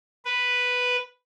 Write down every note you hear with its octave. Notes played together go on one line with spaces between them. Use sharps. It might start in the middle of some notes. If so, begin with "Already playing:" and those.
B4